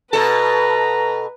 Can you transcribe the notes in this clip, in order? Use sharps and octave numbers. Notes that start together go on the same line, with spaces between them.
B2 A4 B4 A#5